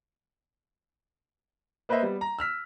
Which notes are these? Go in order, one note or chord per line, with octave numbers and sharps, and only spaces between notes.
A#3 B4 C5 D#5 E5
G3 B3
A#5
E6 F6 B6